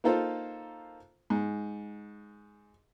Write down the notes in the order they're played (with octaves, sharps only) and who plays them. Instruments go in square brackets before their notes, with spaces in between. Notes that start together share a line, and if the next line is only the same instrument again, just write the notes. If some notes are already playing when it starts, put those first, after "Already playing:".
[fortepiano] A#3 D#4 F4 A4 C5
G#2